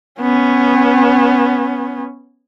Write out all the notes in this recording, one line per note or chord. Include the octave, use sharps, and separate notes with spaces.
B3 C#4